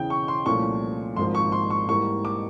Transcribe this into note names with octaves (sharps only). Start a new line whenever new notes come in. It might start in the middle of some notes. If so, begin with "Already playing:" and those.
Already playing: E2 C#3 E3 G5
C#6
C6
C2 A#2 F3 A3 C#4 C#6
G#1 G#2 F3 A#3 C6
C#6
C6
C#6
G#2 E3 G3 A#3 C#6
D6